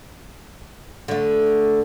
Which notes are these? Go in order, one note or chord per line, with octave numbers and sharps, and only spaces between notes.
D3 A3